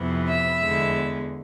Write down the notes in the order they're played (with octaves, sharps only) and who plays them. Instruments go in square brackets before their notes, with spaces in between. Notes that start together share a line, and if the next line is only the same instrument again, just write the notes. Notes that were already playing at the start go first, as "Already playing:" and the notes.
Already playing: [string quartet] F2 C3 E3 B3
E5
E2 D3 G#3 B3